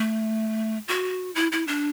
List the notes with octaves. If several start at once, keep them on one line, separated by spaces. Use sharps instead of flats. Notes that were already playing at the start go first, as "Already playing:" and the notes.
Already playing: A3
F#4
E4
E4
D4